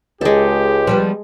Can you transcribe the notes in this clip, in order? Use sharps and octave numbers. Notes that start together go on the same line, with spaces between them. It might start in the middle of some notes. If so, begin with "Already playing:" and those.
C#2 G#3 G4 A4
F3 G3 B3